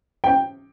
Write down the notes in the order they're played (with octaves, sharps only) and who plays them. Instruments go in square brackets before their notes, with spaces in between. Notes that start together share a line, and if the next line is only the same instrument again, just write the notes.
[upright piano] G5